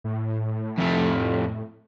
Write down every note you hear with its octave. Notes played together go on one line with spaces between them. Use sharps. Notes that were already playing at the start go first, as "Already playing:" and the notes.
A2
F2 A3